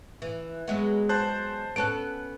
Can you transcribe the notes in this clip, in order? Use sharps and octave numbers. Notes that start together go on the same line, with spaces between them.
E3
F#3 G#3 B3
C5 A5 F#6
B3 C#4 A4 F#6 D7